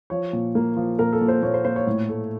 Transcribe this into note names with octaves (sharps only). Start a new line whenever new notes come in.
F3 C#5
A#2
A#3
F3
A#2 A#4
A4
A#2
C5
A#2 C#5
C5
A#2 C5
C#5
A2
A3